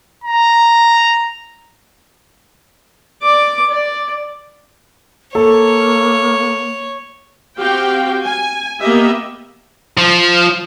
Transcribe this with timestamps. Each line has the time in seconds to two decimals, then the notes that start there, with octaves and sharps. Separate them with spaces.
0.24 A#5
3.22 D5 D6
3.70 D5
5.35 A#3 A4 C#5
7.59 C4 F#4 G4 F5 G5
8.24 G#5
8.81 A#3 B3 G4 D#5 E5
9.97 F3